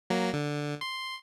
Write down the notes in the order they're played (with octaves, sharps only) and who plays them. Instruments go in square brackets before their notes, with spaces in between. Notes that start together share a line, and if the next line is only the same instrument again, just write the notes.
[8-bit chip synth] F#3 A#3
D3
C6